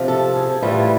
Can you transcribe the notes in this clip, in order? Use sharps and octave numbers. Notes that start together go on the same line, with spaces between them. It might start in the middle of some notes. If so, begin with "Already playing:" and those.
Already playing: C3 F3
A4
G#4
A2 E3 G3 F4